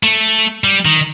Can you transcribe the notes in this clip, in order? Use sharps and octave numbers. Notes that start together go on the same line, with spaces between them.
A3
G3
D#3